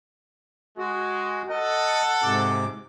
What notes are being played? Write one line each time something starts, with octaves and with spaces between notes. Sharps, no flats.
G#3 F#4
A4 D#5 F#5
G#2 C3 D6